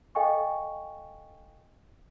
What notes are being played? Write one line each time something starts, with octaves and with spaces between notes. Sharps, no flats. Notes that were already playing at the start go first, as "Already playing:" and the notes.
A4 D#5 F5 G5 G#5 C#6